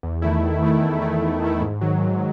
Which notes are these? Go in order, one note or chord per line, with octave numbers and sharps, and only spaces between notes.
E2
D#3 A3 E4
E2
D#3 A3 E4
E2
D#3 A3 E4
E2
D#3 A3 E4
G#2
D#3 F#3
G#2